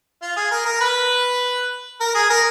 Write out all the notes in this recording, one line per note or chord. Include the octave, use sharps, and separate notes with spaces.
F4
G#4
A#4
A#4
B4
A#4
G#4
A#4